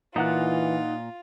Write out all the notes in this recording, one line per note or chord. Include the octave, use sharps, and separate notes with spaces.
A#2 E3 D#4 F4 F#5 F#6